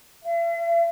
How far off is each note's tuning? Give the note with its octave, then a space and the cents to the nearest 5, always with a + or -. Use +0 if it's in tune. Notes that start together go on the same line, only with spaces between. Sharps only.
E5 +45